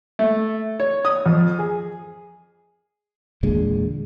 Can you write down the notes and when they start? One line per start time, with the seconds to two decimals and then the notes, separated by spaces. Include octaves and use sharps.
0.19 A3
0.80 C#5
1.05 D#6
1.26 F2
1.59 G#4
3.43 E2 A#2 D3 G#3